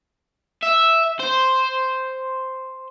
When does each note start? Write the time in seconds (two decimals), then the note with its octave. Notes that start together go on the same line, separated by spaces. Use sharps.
0.63 E5
1.20 C5